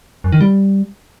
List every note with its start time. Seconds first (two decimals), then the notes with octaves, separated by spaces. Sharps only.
0.24 F#2
0.32 D#3
0.41 G3